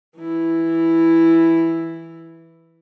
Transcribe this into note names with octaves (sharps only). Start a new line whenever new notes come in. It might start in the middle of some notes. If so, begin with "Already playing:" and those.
E3 E4